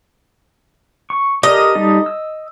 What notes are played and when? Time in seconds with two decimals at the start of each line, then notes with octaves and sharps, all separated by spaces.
1.10 C#6
1.43 G4 A4 A#4 D#5
1.75 G3 D#4 A4
2.06 E6